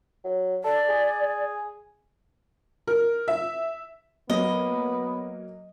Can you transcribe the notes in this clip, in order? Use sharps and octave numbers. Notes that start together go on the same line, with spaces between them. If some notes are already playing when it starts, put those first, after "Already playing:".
F#3
A4 D5
G#4
A#4
E5
F#3 A#3 B3 D#5